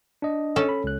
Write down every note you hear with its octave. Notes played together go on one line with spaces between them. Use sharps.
D4 D#5
C#4 A4
B5
C#2 F#6